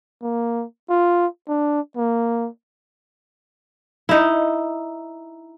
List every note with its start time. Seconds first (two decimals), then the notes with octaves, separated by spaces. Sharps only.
0.22 A#3
0.89 F4
1.48 D4
1.97 A#3
4.09 D#4 E4